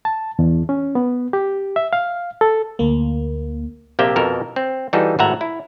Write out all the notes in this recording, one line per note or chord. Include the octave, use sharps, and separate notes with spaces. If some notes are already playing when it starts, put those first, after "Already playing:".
A5
E2
C#4
B3
G4
E5
F5
A4
D2 A#3
A#1 C3 A#3 G4 E5 G5
F2 B2 A4 A#4
C4
E3 G3 D#4 F#4 G#4 A4
G#1 A2 F#4 E5 F#5 A#5
E4